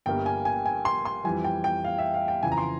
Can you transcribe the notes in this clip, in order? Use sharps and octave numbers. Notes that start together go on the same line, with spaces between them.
G1 G2 G3 A#3 G5
G#5
G#5
G#5
C6
C6
F2 E3 G3 G#5
G5
G5
F5
E5
F5
G5
F2 C#3 E3 G#5
A#5
C6